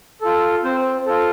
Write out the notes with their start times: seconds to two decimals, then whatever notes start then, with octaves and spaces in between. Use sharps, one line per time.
0.21 F4 A4
0.64 C4 C5
1.06 F4 A4